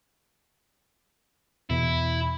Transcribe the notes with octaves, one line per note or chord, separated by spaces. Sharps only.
E2 B2 E4